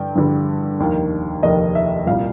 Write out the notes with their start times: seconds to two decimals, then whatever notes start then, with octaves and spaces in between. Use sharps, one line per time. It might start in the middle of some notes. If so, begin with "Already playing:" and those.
Already playing: G2 D3 G3 G5
0.15 G2 D3 G3
0.79 F1 D#2 D#3
1.42 F1 D#2 D#3 D#5
1.75 E5
2.07 C2 A#2 G3 F5